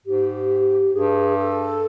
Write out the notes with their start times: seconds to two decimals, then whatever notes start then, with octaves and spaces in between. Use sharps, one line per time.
0.05 G#2 G4
0.93 G2 G#4
1.37 A4